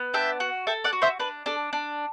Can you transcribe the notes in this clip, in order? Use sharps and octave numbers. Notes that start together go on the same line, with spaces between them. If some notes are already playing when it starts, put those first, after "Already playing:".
Already playing: B3
D4 E5 G5
F#4
A4 E5 G5
D5 F#5
F#4
C5 E5
D4 B4
D4 A4
D4